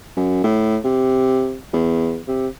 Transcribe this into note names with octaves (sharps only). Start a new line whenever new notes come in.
F#2
A2
C3
E2
C3